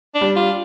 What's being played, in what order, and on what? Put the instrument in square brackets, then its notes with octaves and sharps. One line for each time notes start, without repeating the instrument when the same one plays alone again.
[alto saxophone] D4
[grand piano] G3
[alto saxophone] F4